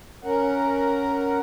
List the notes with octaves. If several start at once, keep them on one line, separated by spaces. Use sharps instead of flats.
C#4 A#4 F#5